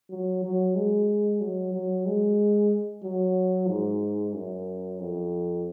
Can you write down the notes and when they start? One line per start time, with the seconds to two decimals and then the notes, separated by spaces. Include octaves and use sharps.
0.10 F#3
0.44 F#3
0.76 G#3
1.41 F#3
1.74 F#3
2.06 G#3
3.03 F#3
3.69 G#2
4.34 F#2
4.99 F2